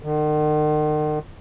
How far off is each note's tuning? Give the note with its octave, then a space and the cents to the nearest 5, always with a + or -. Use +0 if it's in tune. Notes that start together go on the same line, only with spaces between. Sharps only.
D#3 -45